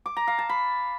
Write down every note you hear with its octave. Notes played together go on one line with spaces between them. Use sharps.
D6
A#5
F5
A5
B5